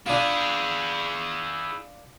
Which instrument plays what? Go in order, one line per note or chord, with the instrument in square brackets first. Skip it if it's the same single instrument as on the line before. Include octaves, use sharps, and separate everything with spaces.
[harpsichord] D4 F4 [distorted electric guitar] E4 G#4